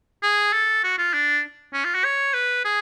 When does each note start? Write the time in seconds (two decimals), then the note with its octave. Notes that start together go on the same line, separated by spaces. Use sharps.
0.22 G#4
0.53 A4
0.84 F#4
0.98 F4
1.13 D4
1.73 C#4
1.84 F4
1.94 F#4
2.04 C#5
2.33 B4
2.64 G#4